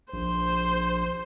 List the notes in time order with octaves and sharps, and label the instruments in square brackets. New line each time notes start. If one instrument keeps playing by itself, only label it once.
[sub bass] A#1 [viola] C5